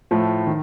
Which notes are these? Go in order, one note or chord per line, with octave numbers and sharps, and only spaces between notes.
A2 F3 A3
D#3